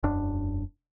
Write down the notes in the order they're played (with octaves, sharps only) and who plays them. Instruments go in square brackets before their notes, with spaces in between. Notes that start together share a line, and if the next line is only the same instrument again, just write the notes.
[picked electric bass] E1 F#2 D4